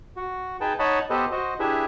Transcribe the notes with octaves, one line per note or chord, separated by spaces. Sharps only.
F#4
D#4 G#4 B4 G5 A5
D#4 C#5 D#5 F#5 A5 B5
B3 G4 A4 B4 C5 D#5
F#4 C5 D#5
D4 E4 G4 G#4 B4 E5